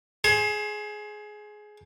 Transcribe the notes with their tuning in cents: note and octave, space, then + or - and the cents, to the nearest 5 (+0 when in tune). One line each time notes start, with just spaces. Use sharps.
G#4 +15 C5 +30